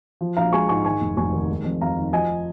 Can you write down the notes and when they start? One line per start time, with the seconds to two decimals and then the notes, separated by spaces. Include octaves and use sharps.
0.21 F3
0.37 A#1 F5 A#5
0.53 G#3 G#5 C#6
0.69 G#2 G#5 C#6
0.84 D#3 G#5 C#6
1.01 F1
1.17 F1 G#5 C#6
1.32 D#2
1.48 G#3
1.64 F2
1.81 F2 F5 A#5
1.97 D#3
2.13 F3 D#5 G#5